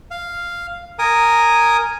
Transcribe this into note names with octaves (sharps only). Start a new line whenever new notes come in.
F5
A#4 G#5 A#5 D#6